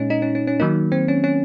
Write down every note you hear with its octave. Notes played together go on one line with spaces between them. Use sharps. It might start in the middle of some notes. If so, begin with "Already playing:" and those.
Already playing: A#2 G#3 C#4 D#4
D#4
C#4
C#4
C#4
D#3 F#3 A#3 D#4
C4
C#4
C#4